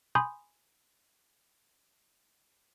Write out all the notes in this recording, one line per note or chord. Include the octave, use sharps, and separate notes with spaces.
G#5 B5 C6 D#6 G6